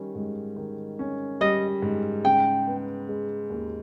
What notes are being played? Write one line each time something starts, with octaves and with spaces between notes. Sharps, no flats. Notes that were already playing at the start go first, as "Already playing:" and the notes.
Already playing: D#3 G3 C#4
G#2
D#3
C#4
G3 D#5
G#2
C#3 G5
B3
G#3
D#2